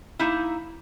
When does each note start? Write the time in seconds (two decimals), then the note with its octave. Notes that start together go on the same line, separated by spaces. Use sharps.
0.19 A#3 D#4 E4